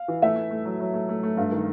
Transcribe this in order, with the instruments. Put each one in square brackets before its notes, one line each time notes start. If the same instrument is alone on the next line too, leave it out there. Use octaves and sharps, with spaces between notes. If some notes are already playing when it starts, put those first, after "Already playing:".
Already playing: [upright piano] F5
[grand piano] E3
[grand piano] A3 [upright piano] E5
[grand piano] A3
A3
F#3
F#3
A3
A3
A3
[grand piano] G2 [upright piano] F5
[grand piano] D#3